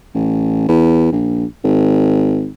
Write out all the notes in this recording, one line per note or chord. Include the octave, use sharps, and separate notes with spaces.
A1
E2
A#1
G#1